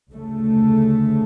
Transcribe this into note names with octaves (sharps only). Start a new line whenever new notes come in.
D2 C#3 A3